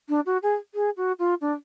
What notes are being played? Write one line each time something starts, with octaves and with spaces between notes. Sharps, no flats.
D4
F#4
G#4
G#4
F#4
F4
D4